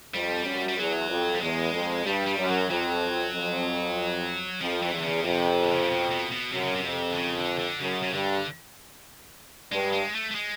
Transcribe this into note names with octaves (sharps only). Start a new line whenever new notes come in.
F2 G3
F#2
G3
E2 F#3
F2
G3
E2 G#3
F2
G2 G3
G3
F#2
F#3
F2 F#3
F2
F2 F3
E3
E2 D3
C#3
F2 C3
D3
C#3
C3
B2
B2
B2
F#2 C3
C#3
C3
F2
D3
C#3
D3
D3
F#2 C#3
C#3
G2 D3
G2 G#3
G#3
A3
A3
G#3